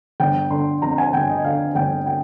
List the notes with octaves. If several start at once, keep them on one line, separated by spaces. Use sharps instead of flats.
G1 G5
D3 C6
F2 A#5
G#5
G1 G5
D#5
D3 F5
G1 G5
D3 G5